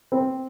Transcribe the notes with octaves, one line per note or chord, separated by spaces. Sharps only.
C4